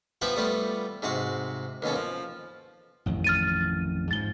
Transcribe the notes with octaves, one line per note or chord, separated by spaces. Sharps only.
F3 B3 G4 B4 E5
G3 A3 B3 F4 G4
G#2 C3 F#4 F5
D#2 B2 C#4 A4
F3
A1 F2 D#3
F6 A6 D#7
G#2 F3 A6 G7